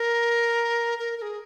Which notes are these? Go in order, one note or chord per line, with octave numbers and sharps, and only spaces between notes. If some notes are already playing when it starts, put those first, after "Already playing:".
Already playing: A#4
A#4
A#4
G#4